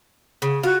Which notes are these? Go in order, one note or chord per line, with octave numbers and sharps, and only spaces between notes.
C#3
F4 F#4